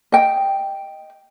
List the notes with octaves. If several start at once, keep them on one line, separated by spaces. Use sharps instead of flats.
D#5 G5